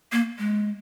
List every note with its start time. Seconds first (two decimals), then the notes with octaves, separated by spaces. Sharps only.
0.12 A#3
0.38 G#3